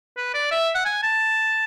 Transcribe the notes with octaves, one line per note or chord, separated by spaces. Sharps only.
B4
D5
E5
F#5
G#5
A5